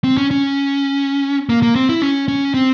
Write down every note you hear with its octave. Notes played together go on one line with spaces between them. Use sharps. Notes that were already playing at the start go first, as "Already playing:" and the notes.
C4
C#4
C#4
A#3
A#3
C4
E4
C#4
C#4
C4